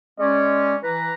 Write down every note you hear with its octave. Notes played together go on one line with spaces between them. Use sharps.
G#3 C#4 D5
E3 B4 A#5